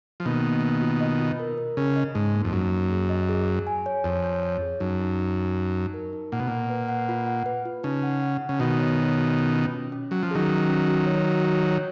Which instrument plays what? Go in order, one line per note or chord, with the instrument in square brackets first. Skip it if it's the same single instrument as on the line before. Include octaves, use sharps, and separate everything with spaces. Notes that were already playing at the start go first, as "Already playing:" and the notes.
[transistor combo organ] F3
[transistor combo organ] B2 D#3 [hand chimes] A#3
[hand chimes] A#3
A#3
F4
D#5
F4
A#4
A#4
[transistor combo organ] C#3 [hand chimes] G#4
[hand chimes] D#5
[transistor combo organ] G#2 [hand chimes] D#4
[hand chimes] A#3
[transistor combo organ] F2
[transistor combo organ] F#2 [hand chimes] D#4
[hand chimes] A#3
G#4
D#5
G#4
G#4
G#5
C#5
[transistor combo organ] F2 [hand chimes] C#5
[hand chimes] C#5
C#5
G#4
[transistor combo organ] F#2 [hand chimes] D#4
[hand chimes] D#4
D#4
D#4
D#4
D#4
A#4
D#4
[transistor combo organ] A#2 [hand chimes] F#5
[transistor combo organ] B2
[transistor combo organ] A#2 [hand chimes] F#5
[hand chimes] B4
F#5
F4
F#5
B4
F4
[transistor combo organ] C#3 [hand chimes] D#4
[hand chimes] F#5
F#5
F#5
[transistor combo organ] C#3
[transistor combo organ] B2 D#3 [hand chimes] F#4
[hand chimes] C#5
C#5
F#4
C#4
F4
C#4
C#4
[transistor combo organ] F#3 [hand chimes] C#4
[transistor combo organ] F3
[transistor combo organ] D#3 F#3 [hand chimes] G#4
[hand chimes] C#4
C#4
F#4
C#5
F#4
C#5
C#5